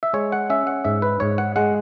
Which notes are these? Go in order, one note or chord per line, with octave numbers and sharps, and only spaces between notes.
E5
G#3 C#5
F#5
C#4 E5
F#5
G#2 E5
B4
G#2 C#5
F#5
G#3 F#5